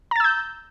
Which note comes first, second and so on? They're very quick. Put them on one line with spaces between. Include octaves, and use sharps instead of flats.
A#5 A6 E6 G6